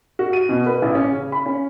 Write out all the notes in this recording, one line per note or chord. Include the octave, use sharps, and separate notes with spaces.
F#4
D#7
B2
B4
A1
C#4
C#3
B5
C#4